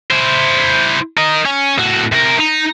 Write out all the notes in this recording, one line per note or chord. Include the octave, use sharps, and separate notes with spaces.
E4 C5
A#4 D#5
C#4
A2 F#4
C3 A#4
D#4 A#5